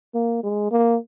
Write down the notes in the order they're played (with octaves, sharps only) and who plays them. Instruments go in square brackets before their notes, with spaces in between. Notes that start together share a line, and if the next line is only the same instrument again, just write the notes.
[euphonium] A#3
G#3
A#3